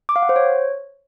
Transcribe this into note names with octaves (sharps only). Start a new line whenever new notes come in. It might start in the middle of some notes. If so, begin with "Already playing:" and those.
D6
F5
F#5
C5
C#5